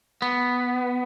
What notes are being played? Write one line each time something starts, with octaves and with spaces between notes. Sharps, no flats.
B3